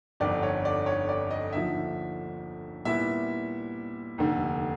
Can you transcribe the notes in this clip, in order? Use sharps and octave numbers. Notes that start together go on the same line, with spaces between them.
G1 F2 D3 D5
C#5
D5
C#5
D5
D#5
D#2 D3 F3 E5
A#2 G3 B3 E4 E5
F1 D#2 D3